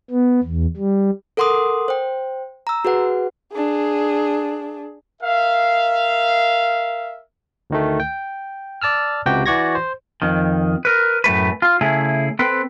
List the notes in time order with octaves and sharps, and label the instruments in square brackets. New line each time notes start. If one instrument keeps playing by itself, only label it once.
[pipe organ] B3
E2
G3
[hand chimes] A4 A#4 F#5 C6 D6 D#6
C5 G5
A#5 E6
F#4 G#4 B4 F#5
[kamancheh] D4 G#4
[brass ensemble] A#4 E5 F5
[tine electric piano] D2 D#3 A3
G5
D5 A5 E6 F6
C#2 C3 F#4 G4 G5
E3 F#4 D5 C#6 G#6 A#6
C5
[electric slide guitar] F2 D#3
A#4 B4
F#2 A2 A3 B4
F4
C#3 A3 E4 G#4
C4 A4 B4